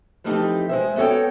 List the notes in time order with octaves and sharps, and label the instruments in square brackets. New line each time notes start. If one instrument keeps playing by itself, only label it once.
[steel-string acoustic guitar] E3 F3 A3 C4 D#4 G4
G#3 C5 E5
B3 F#4 A4 C#5 G5